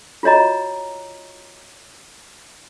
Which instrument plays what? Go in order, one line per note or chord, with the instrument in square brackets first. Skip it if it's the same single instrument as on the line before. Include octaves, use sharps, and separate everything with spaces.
[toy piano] F4 F#4 C#5 D#5 A#5